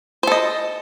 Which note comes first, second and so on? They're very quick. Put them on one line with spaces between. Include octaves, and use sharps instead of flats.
C5 A4 D#5